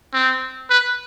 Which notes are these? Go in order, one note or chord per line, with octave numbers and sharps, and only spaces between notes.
C4
B4